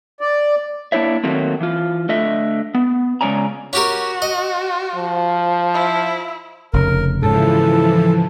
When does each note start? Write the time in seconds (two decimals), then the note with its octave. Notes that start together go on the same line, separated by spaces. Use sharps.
0.21 D5
0.92 A#3 D4 E4 C#5 E5
1.24 D#3 F#3 A3 A#3 C4
1.60 E3 F4
2.09 D3 A3 D#5 E5
2.75 B3
3.21 C#3 G#3 C#4 D5 G#5 A#5
3.73 C#4 F#4 G4 A#4
4.22 D#5
4.95 F3
5.74 E4
6.73 F1 C#3 A#4
7.22 G#2 C#3 E3 F3 A4